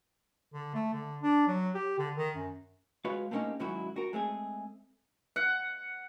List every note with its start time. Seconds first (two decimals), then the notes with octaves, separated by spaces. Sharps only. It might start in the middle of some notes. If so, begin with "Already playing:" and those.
0.53 D3
0.74 A3
0.93 D3
1.22 D4
1.47 F#3
1.74 G4
1.98 D3
2.16 D#3
2.36 F#2
3.05 G#3 F#4 B4 C#5 F5
3.31 A3 A#3 C4 C#4 D#4 G4
3.60 G#2 D#3 F#3 C#4 E4 F#4
3.96 F#4 A#4
4.13 G#3 A3 C4 G#4
5.36 F#5